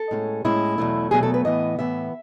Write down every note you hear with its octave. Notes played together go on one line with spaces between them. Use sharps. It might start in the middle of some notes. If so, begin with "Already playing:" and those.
Already playing: A4
A2 G#3 C#4
A2 G#3 C#4 E4
E2 B2 F#3 A3
E2 B2 F#3 A3 G#4
A4
B4
A2 E3 B3 D#5
A2 E3 B3 E5